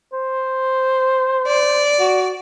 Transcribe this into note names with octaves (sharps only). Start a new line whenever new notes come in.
C5
D5
F#4